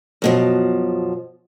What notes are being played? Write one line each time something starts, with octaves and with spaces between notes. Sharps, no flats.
F#2 B2 F3